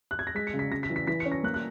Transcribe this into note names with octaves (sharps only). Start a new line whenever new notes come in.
F#6
G#6
A#6
G#3 B6
C#7
C#3
B6
C#3 A#6
B6
E3
B6
E3 B6
C#7
C#4
A#6
A#3 F#6
F#6